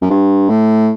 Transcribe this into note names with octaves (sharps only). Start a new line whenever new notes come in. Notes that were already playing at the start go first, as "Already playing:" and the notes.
F#2
G2
A2